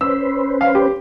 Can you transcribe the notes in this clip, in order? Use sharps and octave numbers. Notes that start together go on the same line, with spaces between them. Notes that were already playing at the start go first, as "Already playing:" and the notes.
C#4 B4 C5 E6
F5
G4